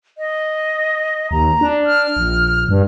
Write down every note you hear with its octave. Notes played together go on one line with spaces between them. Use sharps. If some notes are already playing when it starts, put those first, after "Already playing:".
D#5
D#2 A#5
D4
F6
A#1
G2